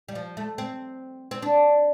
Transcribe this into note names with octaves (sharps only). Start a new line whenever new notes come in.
G3
F3
A3
C4
C4
D4